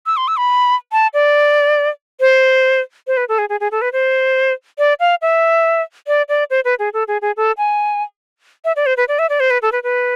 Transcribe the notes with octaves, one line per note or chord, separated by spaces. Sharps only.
E6
C6
E6
B5
A5
D5
C5
C5
B4
A4
G#4
G#4
G#4
A4
B4
C5
D5
F5
E5
D5
D5
C5
B4
G#4
A4
G#4
G#4
A4
G#5
E5
D5
C5
B4
D5
E5
D5
C5
B4
A4
B4
B4